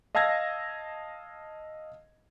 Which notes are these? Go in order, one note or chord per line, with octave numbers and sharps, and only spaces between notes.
D#5 F5 A5 E6 G#6 A#6